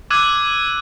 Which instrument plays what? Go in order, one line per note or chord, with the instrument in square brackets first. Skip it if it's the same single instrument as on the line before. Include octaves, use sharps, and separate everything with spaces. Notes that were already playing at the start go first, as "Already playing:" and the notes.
[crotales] D6 E6 F#6 G#6 D#7